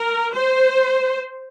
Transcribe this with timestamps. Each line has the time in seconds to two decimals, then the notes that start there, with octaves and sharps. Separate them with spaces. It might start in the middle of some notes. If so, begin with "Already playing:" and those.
Already playing: A#4
0.33 C5